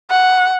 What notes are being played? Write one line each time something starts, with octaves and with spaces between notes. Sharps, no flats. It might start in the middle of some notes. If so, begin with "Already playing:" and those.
F#5